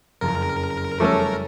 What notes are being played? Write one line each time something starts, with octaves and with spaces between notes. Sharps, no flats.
F#1 F2 A#4 A#5
F3 G3 A3 C#4 A4 D5 D6